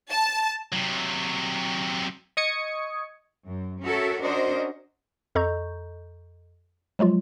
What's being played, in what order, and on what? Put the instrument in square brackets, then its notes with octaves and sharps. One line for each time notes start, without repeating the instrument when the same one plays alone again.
[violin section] A5
[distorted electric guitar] C3 F#3
[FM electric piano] D#5 C#6 D#6 G#6 C#7
[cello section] F#2
C#4 F#4 A4 A#4 C#5 E5
C#4 D4 F#4 A#4 C5 D#5
[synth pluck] F2 A4 D#5 A#5 C#6 G6
F3 F#3 G#3 F4